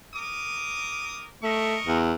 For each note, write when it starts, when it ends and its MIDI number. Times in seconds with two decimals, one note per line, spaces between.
0.15 1.26 70
0.15 1.26 86
0.15 1.26 87
1.43 1.77 57
1.43 1.98 70
1.43 1.98 75
1.43 1.98 85
1.86 2.14 40